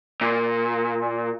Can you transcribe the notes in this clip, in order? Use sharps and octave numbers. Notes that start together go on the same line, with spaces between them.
A#2